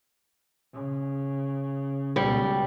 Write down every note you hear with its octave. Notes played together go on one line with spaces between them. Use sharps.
C#3
C#2 B2 G3